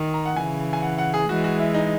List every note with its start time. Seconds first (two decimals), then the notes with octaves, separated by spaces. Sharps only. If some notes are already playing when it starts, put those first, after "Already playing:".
Already playing: D#3
0.14 A#5
0.26 F#5
0.36 C#3 E3 G#5
0.73 G#5
0.82 F#5
0.98 F#5
1.14 G#4
1.29 E3 G#3 F#4
1.44 F#4
1.59 E4
1.74 D#4